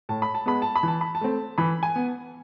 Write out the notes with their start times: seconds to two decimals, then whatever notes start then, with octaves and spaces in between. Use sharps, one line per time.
0.09 A2 A5
0.22 B5
0.35 A5
0.46 G#3 B3 B5
0.62 A5
0.76 B5
0.83 E3 A5
1.01 B5
1.15 A5
1.21 A3 C4
1.58 E3 B5
1.83 G#5
1.96 B3